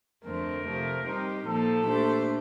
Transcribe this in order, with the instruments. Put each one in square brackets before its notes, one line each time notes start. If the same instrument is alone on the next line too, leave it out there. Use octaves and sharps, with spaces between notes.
[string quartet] F2 D3 A3 C4 [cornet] A#4
[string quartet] C3 F3 A3
G3 C4 D#4 G4
[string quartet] A#2 F3 A#3 D#4 [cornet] A4
[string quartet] A#2 A3 D4 G4 C5